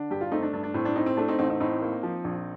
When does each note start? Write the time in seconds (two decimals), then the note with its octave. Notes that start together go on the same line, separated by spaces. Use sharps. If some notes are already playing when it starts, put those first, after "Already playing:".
Already playing: D3 D4
0.11 G2 G4
0.21 F4
0.31 A3 C4 D#4
0.43 D4
0.53 G2 D4
0.63 D4
0.74 A2 C4
0.85 D4
0.96 C4 D#4
1.06 C4
1.17 A3 D4
1.28 C4 D#4
1.39 A1 C4 D#4
1.50 C4 D#4
1.60 A2 C4 D#4
1.82 A#3
2.03 F3
2.24 A#1